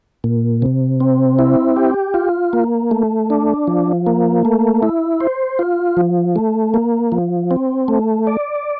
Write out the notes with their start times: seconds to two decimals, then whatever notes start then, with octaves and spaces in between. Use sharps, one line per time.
0.24 A#2
0.62 C3
1.00 C4
1.39 E4
1.76 G4
2.14 F4
2.53 A#3
2.91 A3
3.30 D4
3.67 F3
4.07 A#3
4.45 A3
4.83 E4
5.20 C5
5.59 F4
5.97 F3
6.36 A3
6.74 A#3
7.12 F3
7.51 C4
7.88 A3
8.27 D5